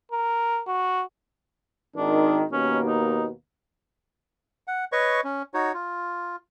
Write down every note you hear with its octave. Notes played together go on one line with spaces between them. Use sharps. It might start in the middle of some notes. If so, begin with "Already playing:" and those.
A#4
F#4
G#1 D#3 D4
D#2 B2 A#3 C#4
D#4
F#5
B4 C#5 D#5 C#6
C#4
D#4 F#4 C#5
F4